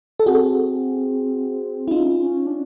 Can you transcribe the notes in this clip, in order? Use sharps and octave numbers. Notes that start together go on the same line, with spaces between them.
A4
C4 F#4 G#4
E4
C#4 D#4 F4
C#4
D4